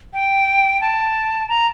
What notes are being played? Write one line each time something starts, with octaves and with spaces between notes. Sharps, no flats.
G5
A5
A#5